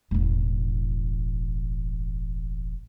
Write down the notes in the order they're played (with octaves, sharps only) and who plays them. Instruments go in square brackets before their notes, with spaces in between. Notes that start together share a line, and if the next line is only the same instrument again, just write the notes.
[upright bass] E1 A1